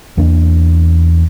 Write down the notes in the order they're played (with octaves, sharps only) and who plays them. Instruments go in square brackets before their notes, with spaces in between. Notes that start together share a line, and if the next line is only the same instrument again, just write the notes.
[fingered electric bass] E2 A#3 D4